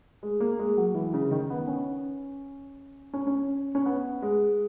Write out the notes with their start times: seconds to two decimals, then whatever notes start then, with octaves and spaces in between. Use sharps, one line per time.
0.23 G#3
0.40 A#3
0.59 G#3
0.77 F#3
0.94 E3
1.14 C#3
1.31 D#3
1.50 B3
1.68 C#4
3.14 C#4
3.27 C#4
3.75 C#4
3.86 B3
4.22 G#3